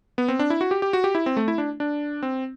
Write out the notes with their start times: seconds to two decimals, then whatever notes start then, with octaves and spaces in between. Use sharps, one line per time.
0.18 B3
0.28 C4
0.39 D4
0.50 E4
0.61 F#4
0.71 G4
0.82 G4
0.93 F#4
1.04 G4
1.15 E4
1.26 C4
1.37 A3
1.48 E4
1.58 D4
1.80 D4
2.23 C4